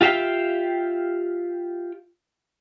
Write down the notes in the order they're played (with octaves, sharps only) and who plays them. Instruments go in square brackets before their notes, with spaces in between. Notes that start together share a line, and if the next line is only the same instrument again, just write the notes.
[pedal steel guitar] F4 G4 E5 F5 G5